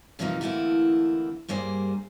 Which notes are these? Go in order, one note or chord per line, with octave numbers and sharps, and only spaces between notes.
G2 C3 E3 F3 A#3 D#4
D3 E3 A3 A#3 C4 E4
G2 G3 A#3 G#4 C5